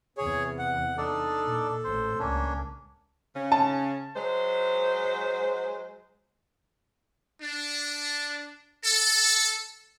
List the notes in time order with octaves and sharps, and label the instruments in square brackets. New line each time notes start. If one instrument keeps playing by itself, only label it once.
[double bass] E2 C3 [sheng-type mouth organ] G#4 C#5
[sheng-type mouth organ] F#5
[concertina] D4 D#4 D5 [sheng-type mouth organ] A4
[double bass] A#2
[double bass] A1 A2 [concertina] C5
[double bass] C#2 [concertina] A#3 C#4 D4
[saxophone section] C#3 C#4
[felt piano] A5
[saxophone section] F#3 G#3 C5
[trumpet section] D4
A4